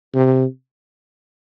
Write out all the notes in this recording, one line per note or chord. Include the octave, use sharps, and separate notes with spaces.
C3